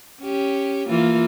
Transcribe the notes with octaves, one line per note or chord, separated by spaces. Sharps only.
C#4 G4
E3 A#3 F4